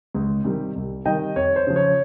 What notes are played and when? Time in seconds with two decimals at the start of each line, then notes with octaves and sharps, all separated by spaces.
0.14 C#2
0.44 C3 D#3 G3
0.76 C2
1.05 C3 D#3 G3 D#5 G5
1.36 F2 C#5
1.56 C5
1.67 C#3 F3
1.76 C#5